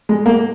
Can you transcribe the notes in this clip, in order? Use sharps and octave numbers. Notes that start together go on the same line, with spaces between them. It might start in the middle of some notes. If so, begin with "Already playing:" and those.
G#3
A#3